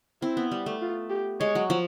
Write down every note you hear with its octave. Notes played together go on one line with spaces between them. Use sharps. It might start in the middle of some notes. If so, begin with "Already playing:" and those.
C4 E4
B3
G3
A3
F4
G4
G#3 C#5
F#3
F3